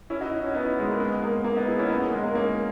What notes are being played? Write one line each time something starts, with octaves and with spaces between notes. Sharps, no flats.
C#4 E4
D#4 F#4
C#4 E4
B3 D#4
G#3
A#3
G#3 B3
A#3
A#3
B3 D#4
E4 G#4
C#4 E4
B3 D#4
A#3
G#3
A#3
A#3 C#4